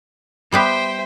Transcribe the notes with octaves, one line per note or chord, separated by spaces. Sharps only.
G3 B3 G4 C5 E5 G5